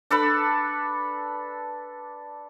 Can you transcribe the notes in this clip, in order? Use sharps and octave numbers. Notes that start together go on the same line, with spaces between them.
D4 A4 B4 B5